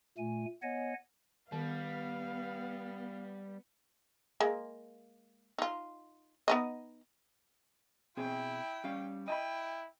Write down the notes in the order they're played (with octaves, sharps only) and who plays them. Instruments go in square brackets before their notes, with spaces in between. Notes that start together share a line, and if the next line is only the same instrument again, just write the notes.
[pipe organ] A#2 A3 G#5
B3 C#5 D#5 F#5 G#5
[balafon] D#3 [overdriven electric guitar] G3 [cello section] B3 [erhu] F5
[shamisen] G#3 A#3
D#4 F4
B3 D#4 D#5
[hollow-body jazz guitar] B2 C4 G#4 [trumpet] E4 [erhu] G5
[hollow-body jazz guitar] G3 C#4 F5
[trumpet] E4 [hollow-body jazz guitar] D#5 A5 B5 [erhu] G5